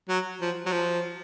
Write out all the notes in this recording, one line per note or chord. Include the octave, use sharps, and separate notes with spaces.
F#3
F3
F#3
F3